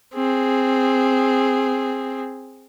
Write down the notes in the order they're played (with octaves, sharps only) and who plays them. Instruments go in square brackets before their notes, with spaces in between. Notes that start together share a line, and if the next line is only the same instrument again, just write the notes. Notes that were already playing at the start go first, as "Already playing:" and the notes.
[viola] C4 G#4